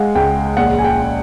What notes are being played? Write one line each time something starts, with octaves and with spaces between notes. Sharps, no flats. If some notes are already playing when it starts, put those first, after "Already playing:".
Already playing: G#3 F5 F#5
C#2 G5
A#1 F#5
G#5
G5